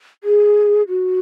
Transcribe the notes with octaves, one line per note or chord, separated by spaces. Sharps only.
G#4
F#4